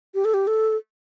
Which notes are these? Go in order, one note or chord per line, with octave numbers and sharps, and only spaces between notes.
G4
A4
G4
A4